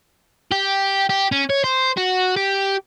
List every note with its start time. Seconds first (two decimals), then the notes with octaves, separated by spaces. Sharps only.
0.51 G4
1.10 G4
1.32 C#4
1.50 C#5
1.64 C5
1.97 F#4
2.36 G4